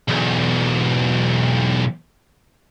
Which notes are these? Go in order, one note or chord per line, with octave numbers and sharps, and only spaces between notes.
B1 E2